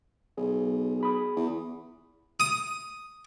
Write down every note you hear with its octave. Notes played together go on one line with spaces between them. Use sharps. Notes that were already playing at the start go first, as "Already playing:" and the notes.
B1 G#4
G#4 B5 D#6
E2
D#6